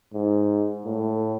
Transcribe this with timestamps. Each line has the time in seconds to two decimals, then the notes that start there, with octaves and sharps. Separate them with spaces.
0.14 G#2
0.86 A2